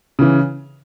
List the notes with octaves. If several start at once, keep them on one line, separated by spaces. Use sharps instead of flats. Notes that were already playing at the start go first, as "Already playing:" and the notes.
C#3 E3